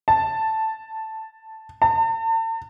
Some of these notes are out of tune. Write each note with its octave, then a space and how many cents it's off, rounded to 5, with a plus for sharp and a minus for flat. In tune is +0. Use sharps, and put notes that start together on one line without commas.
A5 +5
A5 +45